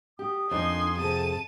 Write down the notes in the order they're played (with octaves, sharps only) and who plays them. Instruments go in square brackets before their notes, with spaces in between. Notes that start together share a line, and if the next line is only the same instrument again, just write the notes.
[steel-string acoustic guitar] G4 [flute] D#6
[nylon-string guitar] F2 [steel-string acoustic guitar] D4 D#4 A#4 [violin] G#5 C6
[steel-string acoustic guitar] C3 G#4 A4 [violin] A5 D#7